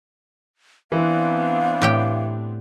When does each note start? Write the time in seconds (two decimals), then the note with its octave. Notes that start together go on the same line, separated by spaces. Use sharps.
0.92 E3 B3 C4 D4 F5
1.82 A2 G4 G5